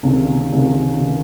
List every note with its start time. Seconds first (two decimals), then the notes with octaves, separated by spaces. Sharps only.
0.03 C#2 C3 D#3
0.52 C#2 C3 D#3
1.00 C3 D#3